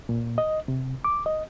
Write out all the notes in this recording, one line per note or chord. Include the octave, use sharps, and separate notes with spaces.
A#2
D#5
C3
D6
D#5